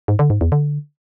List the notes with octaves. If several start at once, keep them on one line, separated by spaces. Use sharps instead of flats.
G#2
D3
G#2
E2
D3